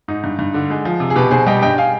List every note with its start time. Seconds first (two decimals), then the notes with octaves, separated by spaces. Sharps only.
0.08 G#2 D#4
0.24 G2
0.39 G2
0.54 D3
0.70 G#3
0.85 F3
1.00 C3
1.10 G#4
1.16 B2 G4 B4
1.31 B2 G#4 C5
1.47 G3 D#5 G5
1.62 G2 D#5 G5
1.78 F5 G#5